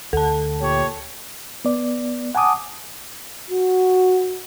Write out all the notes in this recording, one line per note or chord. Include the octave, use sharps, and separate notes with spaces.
D2 A4 A5
A#2 G4 C#5
B3 D5
F#5 G#5 A5 D6 D#6
F#4